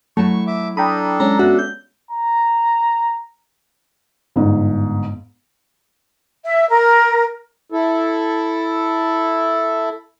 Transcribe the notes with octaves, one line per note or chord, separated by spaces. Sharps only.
F#3 A3 E4 A5 C#6
E5 D6
D4 A4 G5 A#5 B5 D#6
G#3 C#4 A#5
B3 F#4 E5
G6
A#5
G1 G#2
E5
A#4
E4 A4